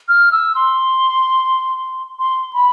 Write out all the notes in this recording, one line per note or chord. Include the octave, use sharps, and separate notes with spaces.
F6
E6
C6
C6
B5